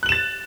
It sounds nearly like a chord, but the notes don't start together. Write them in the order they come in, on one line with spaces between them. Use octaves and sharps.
F#6 F#7 E7 A6